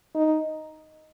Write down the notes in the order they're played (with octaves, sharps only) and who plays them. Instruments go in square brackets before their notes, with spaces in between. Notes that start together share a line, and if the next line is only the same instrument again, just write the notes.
[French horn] D#4